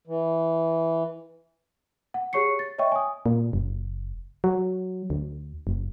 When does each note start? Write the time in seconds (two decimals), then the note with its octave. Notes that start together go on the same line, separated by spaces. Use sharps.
0.07 E3
2.14 F#5
2.33 G4 G#4 C#5 C#6 C7 C#7
2.59 A6
2.79 C#5 D#5 E5 G5 C#6
2.92 G#5 D#6
3.26 A#2
3.53 F#1
4.44 F#3
5.10 D2
5.67 F#1